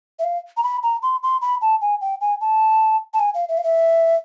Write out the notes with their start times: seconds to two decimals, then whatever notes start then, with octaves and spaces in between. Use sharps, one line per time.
0.19 E5
0.24 F5
0.57 A#5
0.63 B5
0.83 A#5
1.03 C6
1.23 C6
1.42 B5
1.61 A5
1.81 G#5
2.01 G5
2.21 G#5
2.41 A5
3.14 A5
3.19 G#5
3.34 F5
3.49 E5
3.58 F5
3.64 E5